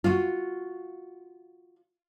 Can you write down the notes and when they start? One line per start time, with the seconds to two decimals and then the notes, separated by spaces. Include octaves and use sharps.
0.04 F4 F#4